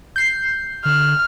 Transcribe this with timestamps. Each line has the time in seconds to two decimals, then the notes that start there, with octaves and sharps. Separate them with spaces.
0.16 G6 C7
0.85 D3 F6